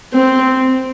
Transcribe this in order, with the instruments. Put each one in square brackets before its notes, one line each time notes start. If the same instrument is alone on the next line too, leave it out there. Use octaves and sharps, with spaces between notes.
[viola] C4